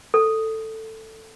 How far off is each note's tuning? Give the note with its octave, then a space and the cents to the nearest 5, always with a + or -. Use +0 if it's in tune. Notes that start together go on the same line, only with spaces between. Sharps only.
A4 +10